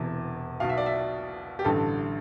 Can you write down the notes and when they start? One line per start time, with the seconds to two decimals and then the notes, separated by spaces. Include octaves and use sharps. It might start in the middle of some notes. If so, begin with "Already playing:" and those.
Already playing: E1 E2 C3
0.60 B1 B2 F5
0.69 E5
0.77 D5
0.86 E5
1.59 G4
1.65 A1 G2 D3 A4